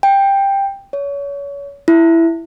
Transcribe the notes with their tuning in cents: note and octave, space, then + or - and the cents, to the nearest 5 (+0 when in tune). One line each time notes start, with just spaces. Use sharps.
G5 +10
C#5 +30
E4 +5